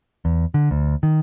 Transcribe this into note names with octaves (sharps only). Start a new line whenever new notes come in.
E2
D3
D2
D#3